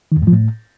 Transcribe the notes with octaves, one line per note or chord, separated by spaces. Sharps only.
D#3
E2
G#2
F3
A2